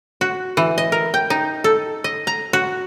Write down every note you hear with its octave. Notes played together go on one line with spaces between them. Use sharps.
F#4
E3
D#5
A#4
G5
D#4
A4
D#5
A#5
F#4